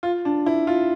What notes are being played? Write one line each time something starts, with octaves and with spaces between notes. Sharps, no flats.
F4
D4
E4
F4